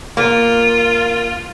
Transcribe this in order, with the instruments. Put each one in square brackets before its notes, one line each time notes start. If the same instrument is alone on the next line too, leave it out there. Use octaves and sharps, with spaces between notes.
[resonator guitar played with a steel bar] A#3 [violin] F4